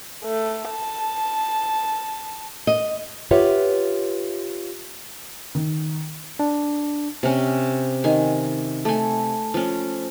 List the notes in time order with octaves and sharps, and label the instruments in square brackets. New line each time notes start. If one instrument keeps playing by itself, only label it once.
[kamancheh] A3
A5
[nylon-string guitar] D#5
F4 G4 B4 C#5 E5 F#5
[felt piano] D#3
[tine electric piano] D4
[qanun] C3 C#4
D#3 G#5
A3 G#5
F3 C#4